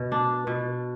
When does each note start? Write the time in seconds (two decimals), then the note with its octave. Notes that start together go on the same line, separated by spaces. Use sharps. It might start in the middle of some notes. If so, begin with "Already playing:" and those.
Already playing: B2
0.12 D4
0.47 B2